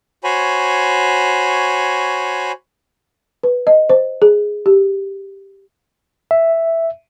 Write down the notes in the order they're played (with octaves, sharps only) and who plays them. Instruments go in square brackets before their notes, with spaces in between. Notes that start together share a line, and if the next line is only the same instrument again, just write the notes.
[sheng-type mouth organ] F#4 C5 C#5 G#5 B5
[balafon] B4
D#5
C5
G#4
G4
[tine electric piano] E5